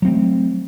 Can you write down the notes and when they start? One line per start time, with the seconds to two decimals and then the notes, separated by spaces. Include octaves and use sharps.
0.02 F#3
0.05 C4
0.07 A3